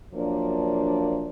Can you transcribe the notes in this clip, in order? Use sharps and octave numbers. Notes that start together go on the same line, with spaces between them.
F#2 F3 A#3 D4